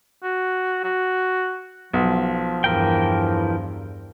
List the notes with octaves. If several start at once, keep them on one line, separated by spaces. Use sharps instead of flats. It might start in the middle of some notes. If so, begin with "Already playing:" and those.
F#4
F#4
B1 F3
E2 G2 E3 A#4 G5